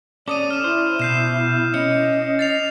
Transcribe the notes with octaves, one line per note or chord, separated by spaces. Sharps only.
C#4 A4 D5 D6 D#6 D#7
F6 E7
E4 C5
B2 G6 C7 E7
C#4 D#5 C#7
D#5 A6 C7 F7